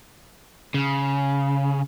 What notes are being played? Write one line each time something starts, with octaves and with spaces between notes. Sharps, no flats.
C#3